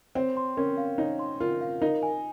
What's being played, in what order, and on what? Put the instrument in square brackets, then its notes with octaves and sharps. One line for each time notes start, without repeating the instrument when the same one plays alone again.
[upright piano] C4 [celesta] C#5
[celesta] C6
[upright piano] C#4 [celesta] A#4
[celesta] F5
[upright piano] D#4 [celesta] C#5
[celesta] C6
[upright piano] F4 [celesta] A#4
[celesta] F5
[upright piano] D#4 [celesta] A#4
[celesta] G#5